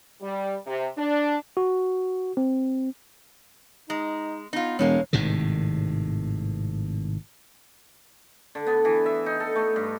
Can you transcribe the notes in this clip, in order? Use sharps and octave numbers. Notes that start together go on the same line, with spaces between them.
G3
C3
D4
F#4
C4
G#3 D#4
B3 D#4 F4
E1 A2 G#3 A#3 C#5
G#1 A2 C3 D#3
D3
B3
E3
E5
D#4
A4
A3
G2